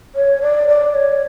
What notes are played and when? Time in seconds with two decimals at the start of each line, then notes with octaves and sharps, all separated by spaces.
0.16 C#5
0.42 D5
0.68 D5
0.95 C#5